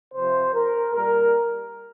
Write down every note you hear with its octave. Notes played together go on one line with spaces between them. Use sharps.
C3 F3 C5
A#4
A#2 G3 A#4